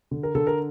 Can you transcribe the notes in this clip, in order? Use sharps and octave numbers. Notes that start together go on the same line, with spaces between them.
D3
A#4
D3 A4
A#4